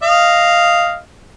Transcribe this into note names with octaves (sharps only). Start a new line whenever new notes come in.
D#5 F5